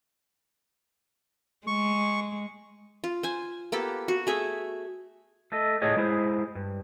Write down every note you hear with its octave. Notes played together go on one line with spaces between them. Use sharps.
G#3 C#6
F4
C5 G#5
A#3 B3 G4 A4
F#4
A3 G#4 E5
A3 A4 D#5
A2 G#4 C#5 D#5
G#3 E4 G#4 C5
G2